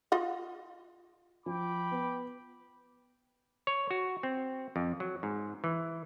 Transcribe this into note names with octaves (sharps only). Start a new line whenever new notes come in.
F4 D#5 F#5
F3 G5 B5 D6
B3
C#5
F#4
C4
F2
F#3
G#2
E3